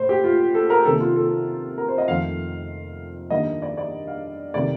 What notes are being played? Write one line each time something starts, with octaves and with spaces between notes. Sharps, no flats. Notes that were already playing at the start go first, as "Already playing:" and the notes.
Already playing: A2 A3 C5
G4
F4
A4
A#4
C3 D#3 A#3 A4
F4
A4
A#4
C5
D#5
F2 D#3 A3 F5
G2 D#3 A#3 D#5
D5
D5
F5
C3 D#3 A3 D5